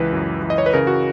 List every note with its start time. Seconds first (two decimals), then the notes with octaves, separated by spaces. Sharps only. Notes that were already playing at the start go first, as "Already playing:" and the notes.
Already playing: C#2 E3 B4
0.13 F#2
0.43 E3
0.50 D#5
0.58 C#5
0.66 B4
0.73 C#3 A#4
0.87 F#4